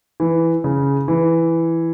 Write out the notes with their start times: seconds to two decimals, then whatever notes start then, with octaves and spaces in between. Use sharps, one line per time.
0.20 E3
0.64 C#3
1.08 E3